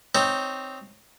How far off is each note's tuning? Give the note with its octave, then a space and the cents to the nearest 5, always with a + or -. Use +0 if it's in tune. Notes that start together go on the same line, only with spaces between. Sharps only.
C4 +0 D#4 +0 C#5 +0